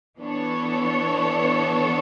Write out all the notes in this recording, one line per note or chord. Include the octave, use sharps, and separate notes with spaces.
E3 B3 D4 A4 C#5